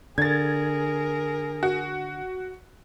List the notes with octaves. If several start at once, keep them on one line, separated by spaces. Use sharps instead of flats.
D3 G#4 A#4 G#6 A6
F#4